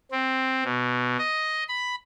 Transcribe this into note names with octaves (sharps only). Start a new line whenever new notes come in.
C4
B2
D#5
B5